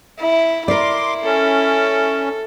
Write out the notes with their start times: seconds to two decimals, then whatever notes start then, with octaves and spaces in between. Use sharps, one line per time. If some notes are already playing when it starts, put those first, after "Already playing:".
0.20 E4
0.68 E4 A#4 D5 C6 D6
1.24 C#4 A4